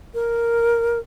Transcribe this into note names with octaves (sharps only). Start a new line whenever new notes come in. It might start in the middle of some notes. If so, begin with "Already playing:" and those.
A#4